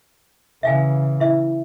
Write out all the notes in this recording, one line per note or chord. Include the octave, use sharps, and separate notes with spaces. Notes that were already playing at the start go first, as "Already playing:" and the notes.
C#3 E3 E5 F5 G#5
E4 E5